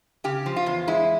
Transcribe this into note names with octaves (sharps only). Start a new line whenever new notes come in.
C#3 G4
F3
F4
E2
G#3 E4